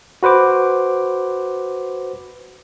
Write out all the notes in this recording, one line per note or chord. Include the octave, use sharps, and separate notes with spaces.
F#4 B4 C5 D6